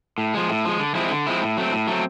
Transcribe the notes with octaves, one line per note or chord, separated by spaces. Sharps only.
A2
F3 G#3
A2
F3 G#3
D3
F3 G#3 C4 E4
D3
F3 G#3 C4 E4
A2
F#3 A3 C4
A2
F#3 A3 C4